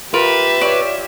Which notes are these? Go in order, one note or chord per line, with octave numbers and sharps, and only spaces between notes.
F4 G4 A#4 B4 E5 A#5
C#5 D5 C#6